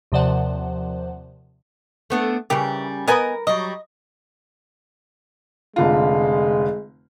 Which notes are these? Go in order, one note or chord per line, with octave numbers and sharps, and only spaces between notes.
D#2 C3 F3 C5 D5 F#5
A3 B3 D4
C#3 E3 G3 G4 A#4
B3 A#4 B4 D#5 G#5
F#3 G3 D#5
F1 D3 G#3 F4